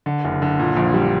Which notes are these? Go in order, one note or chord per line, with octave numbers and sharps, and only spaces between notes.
D3
F#1
D3
A#2
A#1
G3